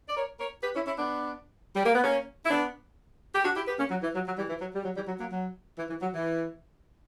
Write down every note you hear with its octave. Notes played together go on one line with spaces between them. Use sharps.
D5
A#4 C#5
A#4 C#5
G4 B4
C#4 E4
C#4 E4
B3 D4
G3
A#3
B3
A#3 C#4
E4
B3 D4
G4
D4 F#4
E4 G4
G4 B4
A#3 C#4
F#3
E3
F#3
F#3
E3 G3
E3
F#3
G3
F#3
E3 G3
F#3
F#3 A#3
F#3
E3
E3
F#3
E3